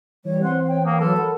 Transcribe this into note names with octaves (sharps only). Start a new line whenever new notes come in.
E3 G3 C#5
C4 F#5 C6 F#6
C#5 G5
A#3 F#5 D#6
F#3 A4 B4 C6 F6
A#4 F#5 B5